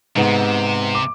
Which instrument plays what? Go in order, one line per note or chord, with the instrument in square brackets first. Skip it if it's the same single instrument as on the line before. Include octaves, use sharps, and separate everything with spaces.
[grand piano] G#2 B3 [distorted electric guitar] C3
[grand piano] D6